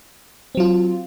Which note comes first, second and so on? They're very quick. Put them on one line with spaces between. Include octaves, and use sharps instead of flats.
C4 F#3 F4